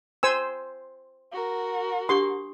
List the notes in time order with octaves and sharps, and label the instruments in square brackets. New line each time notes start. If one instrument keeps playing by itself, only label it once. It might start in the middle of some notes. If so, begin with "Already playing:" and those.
[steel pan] C5 G#5 E6
[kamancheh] F#4 A#4
[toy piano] D4 G4 D#6 [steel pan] C6